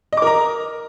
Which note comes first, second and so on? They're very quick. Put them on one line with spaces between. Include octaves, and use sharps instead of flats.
D#5 D6 A#4 A#5